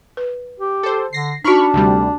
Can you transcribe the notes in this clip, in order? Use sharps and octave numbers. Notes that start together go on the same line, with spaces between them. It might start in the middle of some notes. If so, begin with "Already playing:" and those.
B4
G4
A4 C5
D3 A#6 C7
D4 D#4 F#4 B5 C#6 F6
D2 C3 G3